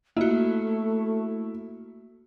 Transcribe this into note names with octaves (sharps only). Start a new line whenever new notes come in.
A3 A#3 E4 F#4